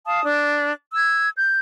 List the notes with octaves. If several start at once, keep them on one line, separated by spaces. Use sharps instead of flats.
F5 A5 D#6
D4
E6 G#6
G6